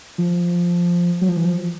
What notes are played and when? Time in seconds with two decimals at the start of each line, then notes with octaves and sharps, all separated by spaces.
0.18 F3
1.21 F#3
1.29 F3
1.37 E3
1.45 F3